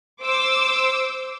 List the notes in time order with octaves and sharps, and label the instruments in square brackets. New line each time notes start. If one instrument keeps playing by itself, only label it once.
[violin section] C5 D6 E6